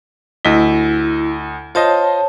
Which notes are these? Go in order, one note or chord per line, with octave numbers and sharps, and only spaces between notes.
D2 E4 D#5 B6
F4 C5 C#5 D#5 A5